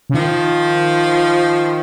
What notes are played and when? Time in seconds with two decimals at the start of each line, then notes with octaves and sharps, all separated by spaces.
0.10 C#3
0.14 D#3 F3